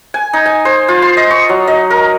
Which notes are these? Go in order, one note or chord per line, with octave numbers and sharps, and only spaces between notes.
G#5
D#4
G#5
C5
F4
C6
D#5
C#6
F#3
D#5
A#4